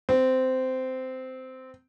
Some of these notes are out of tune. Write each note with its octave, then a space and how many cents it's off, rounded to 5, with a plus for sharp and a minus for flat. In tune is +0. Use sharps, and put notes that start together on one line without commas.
C4 -15